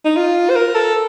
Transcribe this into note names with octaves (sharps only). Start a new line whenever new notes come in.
D#4
F4
C5
A#4
A4